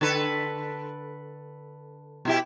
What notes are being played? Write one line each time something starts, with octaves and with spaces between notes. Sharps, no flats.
D3 A4 B4
B2 E4 G4